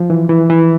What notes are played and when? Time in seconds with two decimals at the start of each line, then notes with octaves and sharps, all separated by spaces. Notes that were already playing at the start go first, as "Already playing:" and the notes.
Already playing: F3
0.10 E3
0.29 E3
0.50 E3